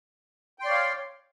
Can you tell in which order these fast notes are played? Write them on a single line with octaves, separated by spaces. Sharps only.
G5 C6 D5 C#5 F5